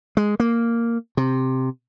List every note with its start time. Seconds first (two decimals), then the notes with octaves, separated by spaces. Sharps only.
0.17 G#3
0.40 A#3
1.17 C3